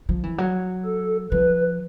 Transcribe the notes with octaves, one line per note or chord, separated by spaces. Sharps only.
F3
E3
F#3
A4
F3 B4